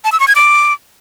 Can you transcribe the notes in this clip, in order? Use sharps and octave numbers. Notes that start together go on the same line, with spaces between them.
A5
E6
C#6
G#6
D6